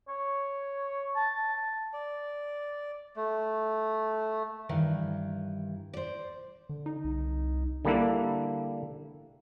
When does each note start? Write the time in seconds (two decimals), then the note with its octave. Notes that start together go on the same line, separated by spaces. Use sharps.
0.08 C#5
1.16 A5
1.94 D5
3.16 A3
4.69 G2 D#3 E3
5.93 C5 D5
6.69 D3
6.86 D#4
7.04 C2
7.85 D3 G3 A#3 D4 E4